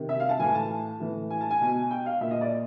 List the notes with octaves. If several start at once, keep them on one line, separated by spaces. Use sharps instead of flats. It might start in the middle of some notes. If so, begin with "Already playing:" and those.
Already playing: C3 D#3
E5
F5
A5
A2 E3 G#5
A5
A2 E3
G#5
A5
G#5
B2
G5
F5
A#2 E5
D#5
D5